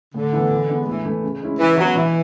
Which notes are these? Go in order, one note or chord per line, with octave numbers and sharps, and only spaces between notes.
A2 D3
E3 B3 E4
E3
G#3 B3 D4
A2 E3
E3 A3
C#3
G#3 C#4 E4
C#3 E3
E3 F#3 G#3 B3 D4
B2 E3